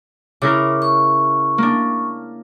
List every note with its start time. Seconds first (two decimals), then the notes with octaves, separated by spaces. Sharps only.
0.42 C#3 E4 A#4 D6
0.82 C#6
1.58 A#3 D4